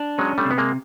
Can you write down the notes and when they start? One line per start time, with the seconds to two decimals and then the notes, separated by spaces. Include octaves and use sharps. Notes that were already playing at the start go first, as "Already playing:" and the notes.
Already playing: D4
0.18 F#3 G#3 C#4
0.38 G3 A3
0.45 C3
0.51 B3
0.58 G#3 A#3